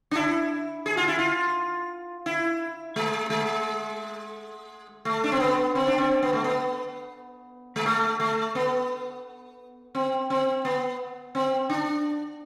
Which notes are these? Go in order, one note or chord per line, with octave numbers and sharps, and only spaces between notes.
D4
E4
G#4
F4
E4
F4
E4
G#3
G#3
A3
D4
C4
B3
C4
D4
C4
B3
A3
B3
G#3
A3
A3
B3
C4
C4
B3
C4
D4